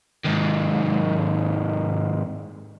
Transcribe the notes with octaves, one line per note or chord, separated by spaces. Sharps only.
D#2 G#2